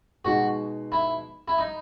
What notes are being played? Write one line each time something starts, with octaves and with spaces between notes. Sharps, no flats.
B2 G#3 D#4 F#4
E4
E4
D#4